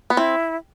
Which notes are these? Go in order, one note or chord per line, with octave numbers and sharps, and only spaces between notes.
B3
C4 E4